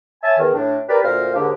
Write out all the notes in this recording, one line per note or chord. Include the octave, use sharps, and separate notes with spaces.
C#5 E5 G#5 A5
E2 D#3
A2 D4
G4 A#4 B4 D5
D2 A#2 A#4 C5 F5
D#2 G#2 D3 D4 G4